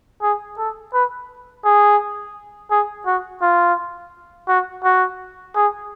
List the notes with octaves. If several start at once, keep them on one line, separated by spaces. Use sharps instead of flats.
G#4
A4
B4
G#4
G#4
F#4
F4
F#4
F#4
G#4